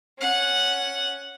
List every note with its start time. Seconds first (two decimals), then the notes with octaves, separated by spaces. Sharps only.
0.18 C#4 F#5